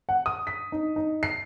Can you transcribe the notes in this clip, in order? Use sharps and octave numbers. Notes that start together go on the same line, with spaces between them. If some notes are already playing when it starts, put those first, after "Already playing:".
F#5
D#6
B6
D#4
D#4
C7